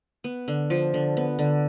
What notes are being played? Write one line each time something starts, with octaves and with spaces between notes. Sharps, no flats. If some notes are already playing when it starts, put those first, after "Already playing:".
B3
D3
F3
D3
B3
D3